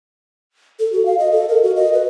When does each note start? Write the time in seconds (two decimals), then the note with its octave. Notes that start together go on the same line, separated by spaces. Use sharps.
0.80 A4
0.92 F#4
1.06 F5
1.19 D#5
1.32 A4
1.49 A#4
1.63 F#4
1.76 D#5
1.93 B4